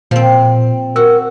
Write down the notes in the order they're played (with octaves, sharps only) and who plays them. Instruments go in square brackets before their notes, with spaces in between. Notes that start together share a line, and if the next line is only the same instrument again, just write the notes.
[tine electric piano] A#2 [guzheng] F3 C4
[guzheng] F#4 [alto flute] A#4 [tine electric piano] E6